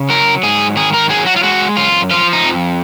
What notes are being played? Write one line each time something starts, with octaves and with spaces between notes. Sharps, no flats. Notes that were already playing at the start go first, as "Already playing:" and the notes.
Already playing: C#3
F#3 A#4
G#2 G#4
D#3 G#4
A#4
F#3 G#4
F#4
F4
G#3 F#4
F#2 F4
F3 F4
D#4
F2